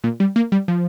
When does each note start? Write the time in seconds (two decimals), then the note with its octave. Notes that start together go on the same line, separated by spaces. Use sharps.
0.04 A#2
0.20 G3
0.36 A#3
0.52 G3
0.68 F3